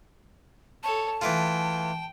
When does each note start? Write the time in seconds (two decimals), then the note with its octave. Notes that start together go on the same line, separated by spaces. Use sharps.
0.83 A4 C#5 A5
1.21 E3 A3 F4 G5